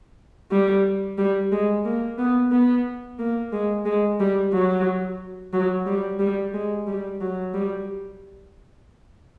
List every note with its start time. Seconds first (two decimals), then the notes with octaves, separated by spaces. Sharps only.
0.51 G3
1.18 G3
1.51 G#3
1.85 A#3
2.18 B3
2.52 B3
3.19 A#3
3.52 G#3
3.85 G#3
4.20 G3
4.53 F#3
5.53 F#3
5.86 G3
6.19 G3
6.53 G#3
6.87 G3
7.21 F#3
7.54 G3